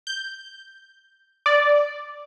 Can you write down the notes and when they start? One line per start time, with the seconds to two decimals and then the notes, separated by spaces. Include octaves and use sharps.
0.07 G6
1.46 D5